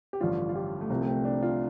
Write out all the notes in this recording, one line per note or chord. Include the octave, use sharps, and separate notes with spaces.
G4
A1 G2 D3 F3 F4
F4
G4
A3
C2 C3 F3 C4
A3
C4
D4
F4